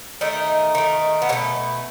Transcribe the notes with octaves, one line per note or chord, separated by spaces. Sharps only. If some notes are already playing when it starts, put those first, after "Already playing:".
D#3 A3 D#4
D#3 A3
B3
B2 A3 C#4